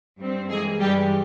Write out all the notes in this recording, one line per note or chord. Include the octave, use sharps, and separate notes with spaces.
G2 G3 C4
G2 E3 G#3 A#3 G#4
G2 E3 G3 G#3 G4